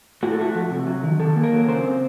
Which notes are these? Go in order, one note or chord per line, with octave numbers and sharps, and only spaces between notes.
A2 F#4
A4
A3 F#4
F3
C3
F#3
D#3
D#3 A4
A#3
A#4
F#3
C#3 C5
C4